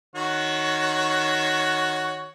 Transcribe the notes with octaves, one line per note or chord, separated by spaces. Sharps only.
D#3 F#4 C#5